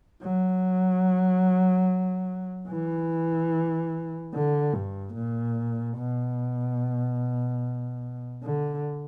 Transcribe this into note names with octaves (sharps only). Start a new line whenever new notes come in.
F#3
E3
D3
G2
A#2
B2
D3